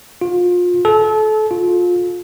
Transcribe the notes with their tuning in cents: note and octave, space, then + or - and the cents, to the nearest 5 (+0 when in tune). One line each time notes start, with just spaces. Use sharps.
F4 +30
A4 -30
F4 +25